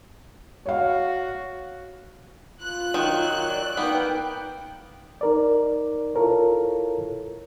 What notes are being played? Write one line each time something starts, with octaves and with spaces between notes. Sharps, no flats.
F#4 C#5 F5
F4 F#6
D#3 F#3
D5
A#3 B3 D#4 G5
D#4 A#4 D5
E4 F4 A4 A#4 C#5